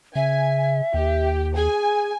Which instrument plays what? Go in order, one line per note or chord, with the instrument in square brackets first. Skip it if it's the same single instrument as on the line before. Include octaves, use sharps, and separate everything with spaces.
[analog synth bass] C#3 [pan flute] E5 [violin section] G#5
[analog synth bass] D#2 [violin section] G4
[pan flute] G#4 [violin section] G#5